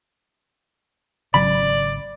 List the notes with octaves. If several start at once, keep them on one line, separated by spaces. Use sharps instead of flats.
G#1 C#3 F#3 D5 B5